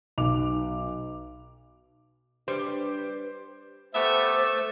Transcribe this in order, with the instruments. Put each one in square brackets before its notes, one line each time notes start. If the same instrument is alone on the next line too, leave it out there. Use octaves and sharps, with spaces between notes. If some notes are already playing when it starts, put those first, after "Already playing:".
[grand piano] B1 D6 F7
[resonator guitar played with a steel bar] G3 [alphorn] D4 [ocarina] B4 [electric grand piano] C5
[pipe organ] A3 A4 E6 [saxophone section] B3 G4 E5 [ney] C5